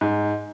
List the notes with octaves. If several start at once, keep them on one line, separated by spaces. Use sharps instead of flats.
G#2